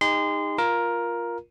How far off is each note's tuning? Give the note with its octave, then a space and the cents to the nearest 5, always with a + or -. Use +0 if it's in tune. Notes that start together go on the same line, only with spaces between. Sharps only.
D#4 +0 G#4 -45 C6 -25
F4 +0 A#4 +10